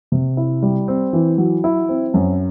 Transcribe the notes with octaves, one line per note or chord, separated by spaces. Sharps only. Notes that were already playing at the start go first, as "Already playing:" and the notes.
C3
E4
G3
C4
E3
F#3
E4
C4
F#2